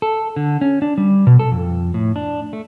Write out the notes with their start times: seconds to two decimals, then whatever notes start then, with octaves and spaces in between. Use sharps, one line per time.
0.02 A4
0.36 D3
0.61 C#4
0.82 D4
0.98 G3
1.27 B2
1.39 A4
1.52 F2
1.94 A2
2.16 D4
2.53 A3